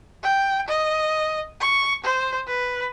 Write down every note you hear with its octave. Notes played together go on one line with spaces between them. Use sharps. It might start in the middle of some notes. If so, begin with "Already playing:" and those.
G5
D#5
C#6
C5
B4